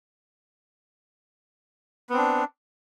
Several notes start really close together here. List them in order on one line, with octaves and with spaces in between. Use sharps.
B3 C4 D4